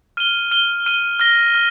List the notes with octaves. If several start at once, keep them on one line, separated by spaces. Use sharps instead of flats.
F6 D#7 G7
F6 D#7 G7
F6 D#7 G7
F6 A#6 G7
F6